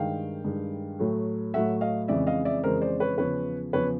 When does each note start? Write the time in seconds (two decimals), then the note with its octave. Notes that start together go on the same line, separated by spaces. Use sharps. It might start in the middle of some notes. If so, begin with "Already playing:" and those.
Already playing: G2 D#3 G#3 F5 G5
0.44 G2 D#3 G#3
0.99 A2 F#3 A3
1.54 A2 F#3 A3 E5 F#5
1.81 D#5 F5
2.08 F2 C#3 E3 G#3 D5 E5
2.27 D#5 F5
2.45 D5 E5
2.63 F2 C#3 E3 G#3 A#4 C5
2.81 C5 D5
3.00 B4 C#5
3.18 E2 C#3 F3 B4 C#5
3.73 E2 C#3 F3 B4 C#5